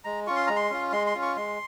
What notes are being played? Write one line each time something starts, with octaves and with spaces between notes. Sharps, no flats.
G#3 A#5
C#4 F4 C#6
C6
G#3 A#5
C6
C#4 F4
G#3 C6
C6
C#4 F4
C#6
G#3 C6